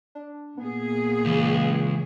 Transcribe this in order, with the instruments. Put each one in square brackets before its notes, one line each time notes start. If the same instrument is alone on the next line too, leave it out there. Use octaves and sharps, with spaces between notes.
[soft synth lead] D4
[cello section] A#2 G#4 [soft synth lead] B3
[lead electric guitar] C#2 [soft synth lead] E3